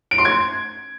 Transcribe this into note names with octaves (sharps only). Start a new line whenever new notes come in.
D7
C6
G#6